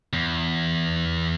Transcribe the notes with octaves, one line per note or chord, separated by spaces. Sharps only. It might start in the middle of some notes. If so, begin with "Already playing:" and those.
E2